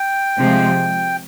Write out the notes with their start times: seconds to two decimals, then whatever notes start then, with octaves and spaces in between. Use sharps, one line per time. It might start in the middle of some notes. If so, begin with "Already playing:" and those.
Already playing: G5
0.37 C3 F3 G#3